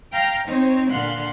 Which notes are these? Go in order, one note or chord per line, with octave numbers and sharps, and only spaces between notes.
F5 G5 A#5
C4 D#4 C5 C#5
A#2 D3 F5 F#5 C6 F#6